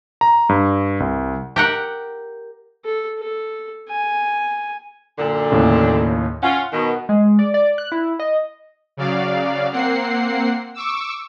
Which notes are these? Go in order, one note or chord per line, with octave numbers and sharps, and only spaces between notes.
A#5
G2
C2
G4 A#4 F#5
A4
A4
G#5
F#2 A#2 D3
D#2 A2 C#3
C#4 F4 F#5
B2 D#3
G#3
D5
D5
F#6
E4
D#5
C#3 F#3 D5 F5
A#3 C4 F#5 C7
C#6 D6 E6